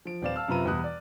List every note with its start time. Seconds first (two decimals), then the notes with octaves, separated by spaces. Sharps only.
0.05 F3 D7
0.22 D#1 C4 B4 D5 F5 E7
0.36 F5 A5 E6 F6
0.48 F#2 C3 F4 B4 A#5 D#7
0.65 E2 B2 G3 B4 D#6 F#6
0.84 D5